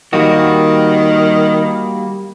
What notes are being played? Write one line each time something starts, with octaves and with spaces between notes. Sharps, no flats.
D#3 G3 A#3 F#4